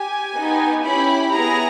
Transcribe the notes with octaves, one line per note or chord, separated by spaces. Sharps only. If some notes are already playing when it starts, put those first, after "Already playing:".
Already playing: G4 G#5
B3 D#4 G4
C#4 E4 G4 B5
B3 E4 G#4 A#5